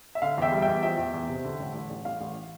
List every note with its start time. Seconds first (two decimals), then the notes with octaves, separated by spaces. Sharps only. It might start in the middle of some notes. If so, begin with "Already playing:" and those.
0.15 E5
0.22 D3 F5
0.38 E2 E5 G5
0.52 G3
0.62 E5 G5
0.67 E2
0.83 F3 E5 G5
0.98 E2
1.14 E2
1.29 C3
1.45 D3
1.60 A1
1.75 A1
1.90 A1
2.05 A1 F5
2.21 A1